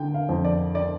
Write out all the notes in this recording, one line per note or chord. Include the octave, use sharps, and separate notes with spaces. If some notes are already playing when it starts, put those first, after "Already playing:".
Already playing: D3 G5
F5
F2
D5
D5